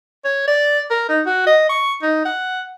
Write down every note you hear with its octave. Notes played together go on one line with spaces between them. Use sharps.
C#5
D5
A#4
D#4
F#4
D#5
C#6
D#4
F#5